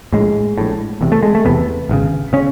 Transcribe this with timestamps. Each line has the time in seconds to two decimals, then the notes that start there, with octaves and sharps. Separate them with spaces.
0.13 A#1 A2 G#3
0.58 A#1 A2
1.01 E1 E2 C3
1.12 A3
1.23 G#3
1.35 A3
1.45 E1 E2 C3 B3
1.89 G#1 F#2 C#3
2.33 C#3 C#4